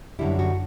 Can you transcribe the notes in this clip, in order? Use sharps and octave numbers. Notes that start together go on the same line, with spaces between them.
F#2 D3 G3 E4
F#4